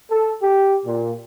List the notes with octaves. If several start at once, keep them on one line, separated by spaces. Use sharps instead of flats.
A4
G4
A#2